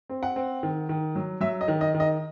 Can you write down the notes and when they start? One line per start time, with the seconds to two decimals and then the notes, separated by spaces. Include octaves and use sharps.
0.09 C4
0.23 F#5
0.36 C4
0.63 D#3
0.89 D#3
1.15 F#3
1.41 F#3 E5
1.61 D#5
1.68 D#3
1.81 D#5
1.94 D#3
2.00 D#5